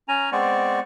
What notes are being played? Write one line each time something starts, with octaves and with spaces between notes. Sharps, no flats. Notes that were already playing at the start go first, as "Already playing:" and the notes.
C#4 G#5 A#5
G#3 B3 C4 C5 D5 C#6